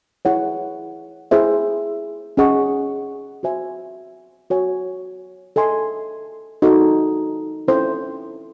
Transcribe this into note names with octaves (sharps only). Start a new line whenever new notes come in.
E4 G#4 C#5 F#5
E4 G#4 C5 E5
C#4 G#4 D#5 F#5 C#6
F#4 C5 E5 G#5
F#4 C#5 G#5
A4 D#5 G#5 C6
D#4 F#4 A4
C#4 E4 A4 C5